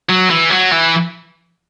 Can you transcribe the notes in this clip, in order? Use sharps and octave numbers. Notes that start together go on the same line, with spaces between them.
F#3
E3
F#3
E3